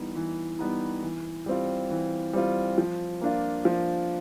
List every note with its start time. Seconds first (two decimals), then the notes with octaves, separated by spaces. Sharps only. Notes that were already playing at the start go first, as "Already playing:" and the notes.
Already playing: E3 G3 B3 D#4
0.16 E3
0.59 G3 B3 D#4
1.03 E3
1.46 G3 C4 F4
1.90 E3
2.33 G3 C4 F4
2.78 F3
3.21 A#3 D4 F4
3.65 F3